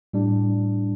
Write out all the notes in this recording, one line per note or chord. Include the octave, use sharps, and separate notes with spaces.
A2 G3 D4